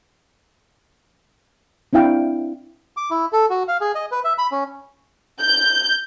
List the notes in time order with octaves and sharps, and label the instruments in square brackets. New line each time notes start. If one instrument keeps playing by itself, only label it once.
[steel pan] C4 D4 E4 F5 G5
[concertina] D6
E4
A4
F#4
F5
G#4
D#5
B4
E5
B5
C#4
[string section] G6